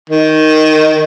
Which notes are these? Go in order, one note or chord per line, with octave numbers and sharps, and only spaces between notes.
D#3